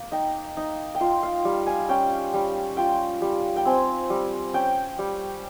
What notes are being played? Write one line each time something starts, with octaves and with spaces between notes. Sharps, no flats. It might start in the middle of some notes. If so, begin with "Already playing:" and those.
Already playing: A#3
D#4 G5
D#4
G5
F4 F5
F5
G3
G#5
C#4 G5
G3
F4 G5
G3
G5
C4 G#5
G3
C#4 G5
G3